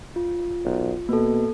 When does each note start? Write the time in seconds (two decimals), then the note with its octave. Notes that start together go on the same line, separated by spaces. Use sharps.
0.16 F4
0.65 B1
1.09 B2 A#3 A4